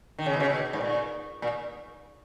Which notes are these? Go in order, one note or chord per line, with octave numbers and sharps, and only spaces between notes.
D#3
C#3
B2
C#3
B2
G#2
A#2
A#2